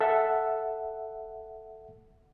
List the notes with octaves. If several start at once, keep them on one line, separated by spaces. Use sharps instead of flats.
A4 E5 F#5